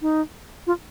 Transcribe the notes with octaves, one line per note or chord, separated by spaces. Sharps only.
D#4
F4